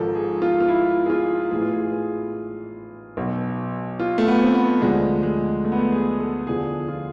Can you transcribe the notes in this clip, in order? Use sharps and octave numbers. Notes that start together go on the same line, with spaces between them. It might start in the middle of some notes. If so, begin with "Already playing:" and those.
Already playing: G#1 G#2 F3 A4
G#4
F4
F4
E4
G#4
F4
A1 A2 E3 G#4
F4
G#4
G#4
B1 B2
F4
A3
B3
C4
B3
D2 D3 F3 G#3
G#3
A3
B3
A3
G#4
A4
E2 D3 F3 G#4
F4